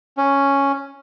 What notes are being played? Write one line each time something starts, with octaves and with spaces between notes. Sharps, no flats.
C#4